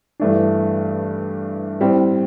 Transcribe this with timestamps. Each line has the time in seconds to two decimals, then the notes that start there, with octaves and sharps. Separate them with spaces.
0.20 G2 E3 A3 D4
1.81 A2 G3 C4